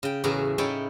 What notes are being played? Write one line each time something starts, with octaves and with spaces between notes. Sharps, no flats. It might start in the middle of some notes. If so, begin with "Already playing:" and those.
C#3 G5
E2 A2 C#3 F#4 G#4 A#5
C#3 D#4 E4 C#5 G5 A5